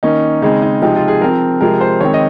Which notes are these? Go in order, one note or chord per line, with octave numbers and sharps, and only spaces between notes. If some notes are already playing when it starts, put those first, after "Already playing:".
D#3 A#3 C#4 D#4
C#3 G#3 C4 D#4
D#4
C3 F3 G#3 C4 D#4
F4
G#4
F3 C4 A#4
C3 F3 G#3 C4 A#4
C5
D#3 G#3 C4 C#5
D#5